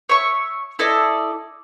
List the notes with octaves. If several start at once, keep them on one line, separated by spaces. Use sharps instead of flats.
C#5 E5 C#6
E4 A4 D5 D#5